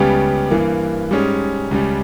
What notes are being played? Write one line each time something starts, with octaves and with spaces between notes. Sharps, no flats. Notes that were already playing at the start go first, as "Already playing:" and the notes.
Already playing: C#2 C#3 G3 B3 G4
G2 E3 A#3
G#2 G3 C#4 G#4
C#2 C#3 G3